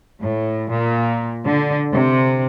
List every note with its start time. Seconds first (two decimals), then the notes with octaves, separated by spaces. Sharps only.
0.22 A2
0.71 A#2
1.46 D3
1.92 C3